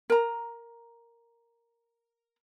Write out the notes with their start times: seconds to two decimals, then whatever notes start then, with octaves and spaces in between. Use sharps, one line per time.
0.10 A#4 A#5